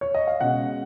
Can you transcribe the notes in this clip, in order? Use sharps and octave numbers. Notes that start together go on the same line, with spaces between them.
C#5
D#5
F5
B2 G#3 C#4 F#5